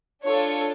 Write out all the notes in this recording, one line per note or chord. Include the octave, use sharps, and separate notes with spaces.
D4 F4 A4 C#5